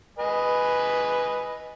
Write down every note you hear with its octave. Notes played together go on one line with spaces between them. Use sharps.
B4 D#5 G#5